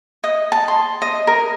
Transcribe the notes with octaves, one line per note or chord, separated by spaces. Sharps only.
D#5
A5
C6
D#5
A#4